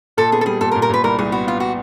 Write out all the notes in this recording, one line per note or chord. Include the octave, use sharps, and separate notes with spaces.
A#2 A4
B3 G#4
A4
G3 G#4
A#2 A4
A#4
A#2
A#4
A#2 B4
C2 A#4
C2 G#4
B3 F#4
B3 F4
F#4